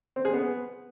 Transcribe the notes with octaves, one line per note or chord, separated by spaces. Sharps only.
C4
G#4
B3